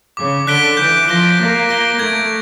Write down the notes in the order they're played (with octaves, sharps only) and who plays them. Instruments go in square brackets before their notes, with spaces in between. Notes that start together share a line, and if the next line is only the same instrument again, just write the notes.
[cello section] C#3 [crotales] D6
[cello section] D3 [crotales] F#6 B6 D7 G7
[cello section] E3 [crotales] G6
[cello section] F3 [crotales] A#6 D7 G7
[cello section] A#3 [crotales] G6
[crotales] A#6 D7 G7
[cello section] A3 [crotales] G#6